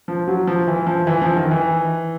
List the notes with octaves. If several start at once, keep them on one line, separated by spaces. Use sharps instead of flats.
F3
F#3
F3
E3
F3
E3
F3
D#3
E3